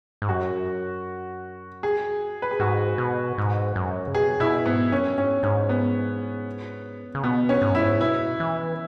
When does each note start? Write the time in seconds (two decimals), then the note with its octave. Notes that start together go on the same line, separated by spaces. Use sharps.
0.22 G#2
0.29 F#2 F#4
1.83 G#4
2.42 B4
2.51 G#4
2.60 G#2 F#4
2.98 B2
3.38 G#2
3.76 F#2
4.07 C#3
4.14 B2 G#4
4.40 B2 E4
4.66 G#2 B3
4.91 F#2 C#4
5.17 G#2 C#4
5.43 G#2 C#4
5.69 B3
7.15 C#3
7.23 B2 B3
7.49 C#4
7.62 G#2
7.71 F#2 E4
7.81 G#2
8.01 B2 E4
8.40 E3